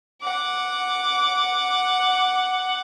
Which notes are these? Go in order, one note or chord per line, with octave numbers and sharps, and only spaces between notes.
F#5 D6